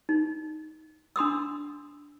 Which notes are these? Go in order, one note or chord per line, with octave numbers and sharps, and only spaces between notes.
D#4
D4 C6 D#6 E6